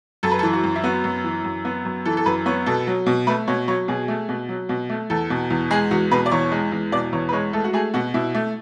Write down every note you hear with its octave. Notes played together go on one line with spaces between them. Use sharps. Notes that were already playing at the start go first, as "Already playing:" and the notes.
F#2 A4
B4
A4
E3
F#4
F#2
E4
B3 F#4
F#2
E3
F#2
B3
F#2
E3 A4
A4
F#2 B4
B3 C#5
B2 A4
F#3
B2
A3 B4
B2 C#5
F#3 C#5
B2 G#4
A3
B2
F#3
B2
A3
E2 A4
B2
E2
G#3 G#4
E2 F#4
B2 B4
D5
E2 C#5
G#3
E2
B2 D5
E2 C#5
B4
G#3 C#5
A3 A4
F#4
A3 G#4
B2 F#4
B2 E4
A3